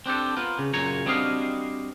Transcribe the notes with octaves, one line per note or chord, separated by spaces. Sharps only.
C4 D4 G4 A4
B3 F4 A#4
C#3
F#2 A#2 C#3 C#5 A#5
G3 C4 D4 F#4 D#5 F5